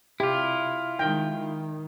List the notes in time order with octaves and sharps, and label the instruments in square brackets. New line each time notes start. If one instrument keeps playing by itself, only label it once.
[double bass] C3 [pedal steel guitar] E4 F4 [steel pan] G4
[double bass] D#3 G#3 [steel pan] G5
[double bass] D#3